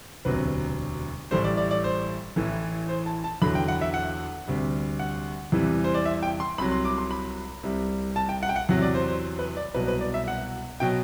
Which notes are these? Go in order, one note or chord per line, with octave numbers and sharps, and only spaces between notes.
E1 D2 C3 F#3 B4
A1 A2 G3 C5
D5
D5
D5
C5
A1 A2 E3
C5
A5
A5
E2 D3 F#3 B5
G5
F#5
E5
F#5
D2 C3 G3
F#5
E2 C3 E3 G3
C5
D5
E5
G5
C6
C2 C3 F#3 B5
C6
D6
C6
B5
C2 C3 G3
A5
G5
F#5
G5
F#5
E2 C3 F#3
D5
C5
C5
B4
D5
C2 B2 F#3 B4
B4
D5
E5
F#5
B2 F#3 G5